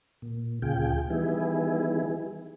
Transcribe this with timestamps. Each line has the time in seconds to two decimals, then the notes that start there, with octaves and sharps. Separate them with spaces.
0.22 A#2
0.62 D2 A#2 C#3 F4 G#4 G5
1.10 D#3 E3 G3 B3 E4 G#4